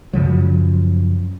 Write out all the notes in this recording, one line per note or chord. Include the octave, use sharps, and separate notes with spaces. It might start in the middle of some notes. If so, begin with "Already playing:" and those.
F#2 C#3 F3 F#3